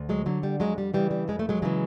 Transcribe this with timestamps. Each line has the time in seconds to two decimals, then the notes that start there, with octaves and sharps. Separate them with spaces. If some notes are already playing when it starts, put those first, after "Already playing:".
Already playing: D2
0.09 F#3 G#3
0.26 D3 F#3
0.43 G3
0.60 F2 F#3 G#3
0.78 G3
0.94 C#3 E3 G3
1.11 G3
1.28 F2 G#3
1.39 A3
1.49 F#3 G#3
1.62 C#3 E3 F#3 G#3